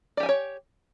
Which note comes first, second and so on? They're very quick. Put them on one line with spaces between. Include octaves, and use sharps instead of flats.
D5 G4 G#5 G5 C#5